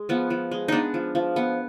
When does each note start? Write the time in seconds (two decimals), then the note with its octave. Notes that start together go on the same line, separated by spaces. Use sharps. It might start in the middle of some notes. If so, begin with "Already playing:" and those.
Already playing: G#3 G#4
0.09 F3 B3
0.30 F3
0.51 G#3
0.68 B3 D4 D#4
0.94 F3
1.15 F3
1.36 B3